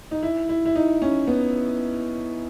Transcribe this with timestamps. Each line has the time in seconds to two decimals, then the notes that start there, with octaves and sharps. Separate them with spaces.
0.11 D#4
0.23 E4
0.49 E4
0.65 E4
0.76 D#4
1.02 C#4
1.27 B3